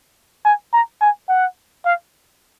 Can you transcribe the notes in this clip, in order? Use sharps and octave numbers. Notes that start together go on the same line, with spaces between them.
G#5
A#5
G#5
F#5
F5